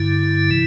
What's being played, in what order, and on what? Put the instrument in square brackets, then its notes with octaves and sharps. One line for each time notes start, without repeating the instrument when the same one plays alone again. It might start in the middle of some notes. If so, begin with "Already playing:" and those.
Already playing: [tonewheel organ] G2 D3 E4
C3 E3